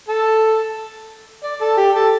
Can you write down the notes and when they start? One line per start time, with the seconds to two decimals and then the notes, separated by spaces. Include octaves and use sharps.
0.09 A4
1.44 D5
1.61 A4
1.77 G4
1.95 A4